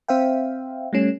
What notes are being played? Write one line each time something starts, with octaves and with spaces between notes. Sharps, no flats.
C4 C5 E5 F5 G5
G3 A3 C#4